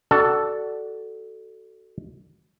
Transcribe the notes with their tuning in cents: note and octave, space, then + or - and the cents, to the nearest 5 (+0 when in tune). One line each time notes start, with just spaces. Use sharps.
D4 +0 F#4 +25 A4 +0